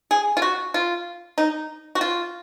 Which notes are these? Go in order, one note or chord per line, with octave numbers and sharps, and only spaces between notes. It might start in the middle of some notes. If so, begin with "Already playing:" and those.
G#4
F4
F#4
F4
D#4
F#4
F4